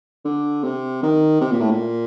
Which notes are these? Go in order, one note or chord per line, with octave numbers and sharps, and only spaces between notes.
D3
C3
D#3
C3
A#2
A2
A#2